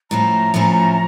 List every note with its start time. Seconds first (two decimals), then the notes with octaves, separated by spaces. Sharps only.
0.11 A2 F3 A3 C#4 A#5
0.54 A2 F3 A3 C#4